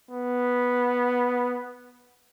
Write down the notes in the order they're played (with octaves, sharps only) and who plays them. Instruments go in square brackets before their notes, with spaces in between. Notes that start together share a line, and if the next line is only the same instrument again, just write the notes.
[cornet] B3